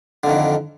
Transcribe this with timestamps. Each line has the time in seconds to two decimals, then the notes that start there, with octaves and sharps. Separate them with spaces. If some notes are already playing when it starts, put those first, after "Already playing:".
0.24 D3
0.26 F2
0.29 D#3